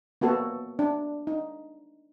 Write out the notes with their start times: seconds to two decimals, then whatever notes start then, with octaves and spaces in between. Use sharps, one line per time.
0.21 A#3 B3 F#4 A4
0.79 D4
1.27 D#4